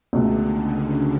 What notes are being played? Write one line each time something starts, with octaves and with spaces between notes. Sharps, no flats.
C#2 B2 D3 A3
C#3